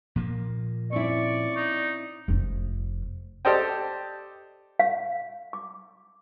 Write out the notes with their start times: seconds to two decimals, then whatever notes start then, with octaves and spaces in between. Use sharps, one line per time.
0.16 A#2 F3 A#3
0.92 C4 C#4 E4 D5 C#6
1.56 D#4
2.28 F1 F2
3.45 G4 A4 C5 D5 D#5 G5
4.80 F5
5.53 D6